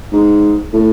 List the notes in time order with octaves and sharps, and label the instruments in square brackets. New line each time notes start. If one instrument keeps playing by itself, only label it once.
[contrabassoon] G#2
A2